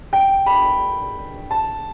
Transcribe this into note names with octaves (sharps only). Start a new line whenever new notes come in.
G5
B5
A5